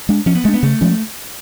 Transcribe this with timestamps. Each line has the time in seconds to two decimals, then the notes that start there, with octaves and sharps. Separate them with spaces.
0.09 G#3 D4
0.26 F3 C#4
0.35 B3
0.44 G#3 A3 D4
0.54 B3
0.63 C#3 A3
0.81 F3 G#3 C#4